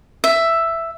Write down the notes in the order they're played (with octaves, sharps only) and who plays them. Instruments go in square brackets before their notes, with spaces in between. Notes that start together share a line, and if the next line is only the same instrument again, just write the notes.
[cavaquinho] E5